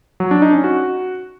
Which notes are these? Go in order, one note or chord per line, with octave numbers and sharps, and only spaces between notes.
F#3
D4
D#4
C#4
F#4